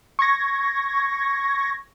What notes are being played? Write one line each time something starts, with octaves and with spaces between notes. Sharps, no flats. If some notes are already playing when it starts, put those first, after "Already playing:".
C#6 G#6 A#6